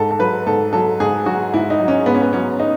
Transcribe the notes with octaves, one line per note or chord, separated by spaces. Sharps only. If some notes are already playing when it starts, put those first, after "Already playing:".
Already playing: G#2 A4
A4
F#3 B4
G#2 A4
F#3 A4
G#2 G#4
F#3 F#4
G#2 E4
D#4
F#3
C#4
G#2 B3
C#4
B3
F#3 C#4
D#4